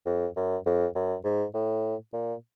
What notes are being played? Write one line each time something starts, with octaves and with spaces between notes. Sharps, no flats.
F2
F#2
F2
F#2
G#2
A2
A#2